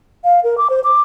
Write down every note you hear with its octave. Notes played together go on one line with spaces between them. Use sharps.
F5
A#4
D6
C5
D6